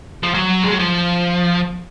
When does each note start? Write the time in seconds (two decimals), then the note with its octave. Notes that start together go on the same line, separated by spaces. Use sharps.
0.23 F3
0.34 F#3
0.63 G#3
0.71 F#3
0.79 F3